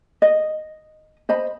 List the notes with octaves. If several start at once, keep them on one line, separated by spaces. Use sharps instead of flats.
D#5
C5 D#5 B5